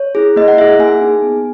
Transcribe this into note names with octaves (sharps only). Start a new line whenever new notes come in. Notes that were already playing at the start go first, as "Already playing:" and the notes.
Already playing: C#5
E4 G#4
A#3 D#5
F#5
E4 G#4 E5
F#5
A#3 G#5
D#4 G#4
B3